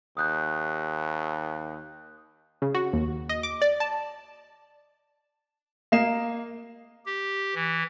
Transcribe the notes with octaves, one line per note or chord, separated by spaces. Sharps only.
D#2 D#6 F#6 G6
C#3
F#4
D#2
D#5
D6
D5
A5
A#3 D#5 C7 E7
G4
E3